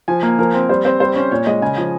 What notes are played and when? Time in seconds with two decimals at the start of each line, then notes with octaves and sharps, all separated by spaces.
0.08 F3 G#5
0.23 A#3
0.39 F3 A#4
0.54 C4
0.69 G3 C5
0.85 C4 C5
1.00 G3 C5
1.16 C#4
1.31 A#2 C#5
1.46 G#3 D#5
1.62 C#3 G#5
1.78 F3